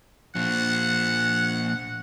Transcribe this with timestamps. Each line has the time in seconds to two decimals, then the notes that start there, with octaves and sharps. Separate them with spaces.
0.35 A#2 F3 F#5